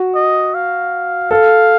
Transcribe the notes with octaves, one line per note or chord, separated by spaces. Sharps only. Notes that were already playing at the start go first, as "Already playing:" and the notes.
Already playing: F#4
D#5
F5
A4 F5